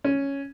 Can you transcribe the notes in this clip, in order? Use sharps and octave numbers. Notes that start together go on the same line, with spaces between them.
C#4